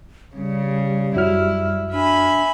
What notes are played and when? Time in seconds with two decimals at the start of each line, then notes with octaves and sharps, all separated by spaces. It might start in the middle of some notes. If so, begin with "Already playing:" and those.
0.35 C#3 G3
1.16 F#2 F#3 E4 F6
1.92 D4 E5 G#5 B5